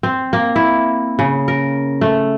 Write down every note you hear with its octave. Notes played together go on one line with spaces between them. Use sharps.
C4
A#3
E4
C#3
A#4
A3